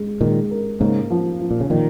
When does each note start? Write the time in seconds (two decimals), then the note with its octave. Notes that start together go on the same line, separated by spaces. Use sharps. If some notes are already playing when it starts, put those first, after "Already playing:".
Already playing: G#3
0.21 A#2 D#3 G#3
0.51 A#4
0.80 G#2 C#3 A#3
1.10 F3
1.40 F3
1.51 A#2
1.60 C#3
1.70 A#2 D#3 F3